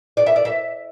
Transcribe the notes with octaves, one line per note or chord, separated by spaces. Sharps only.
D5
E5
D5
E5